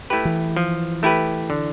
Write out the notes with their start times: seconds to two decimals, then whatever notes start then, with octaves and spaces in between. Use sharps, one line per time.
0.10 A3 E4 G4 B4
0.25 E3
0.56 F3
1.03 A3 E4 G4 B4
1.50 D3